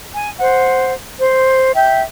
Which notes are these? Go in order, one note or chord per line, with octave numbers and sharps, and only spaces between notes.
G#5
C5 F#5
C5
E5 G5